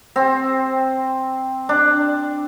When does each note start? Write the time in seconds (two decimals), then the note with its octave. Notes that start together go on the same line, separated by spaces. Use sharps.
0.16 C4
1.69 D4